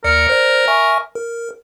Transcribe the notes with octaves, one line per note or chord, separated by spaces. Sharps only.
D#2 A#4 D5 C#7
C5 D5
E5 G#5 C#6
A#4